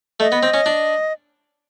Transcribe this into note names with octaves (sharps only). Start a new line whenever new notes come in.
A3 D#5
B3
C4
C#4
D4